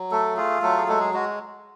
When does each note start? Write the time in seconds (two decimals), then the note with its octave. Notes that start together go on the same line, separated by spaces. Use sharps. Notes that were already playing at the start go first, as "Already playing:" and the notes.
Already playing: F#3
0.11 A3 A4
0.37 F4 G#4
0.62 F#3 A3 A4
0.77 G#4
0.87 G#3 A3 A4
1.00 G#4
1.14 G#3 F#4